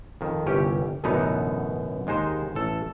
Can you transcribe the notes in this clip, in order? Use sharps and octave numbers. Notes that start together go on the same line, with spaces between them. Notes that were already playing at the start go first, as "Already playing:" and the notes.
F2 D#3
G1 C2 C#4 G4
A1 F#2 B2 D3 B3 D#4
D#2 G#3 D#4 C5
A1 A4